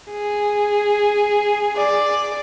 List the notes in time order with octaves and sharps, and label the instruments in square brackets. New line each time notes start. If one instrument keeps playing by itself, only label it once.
[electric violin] G#4
[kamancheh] D5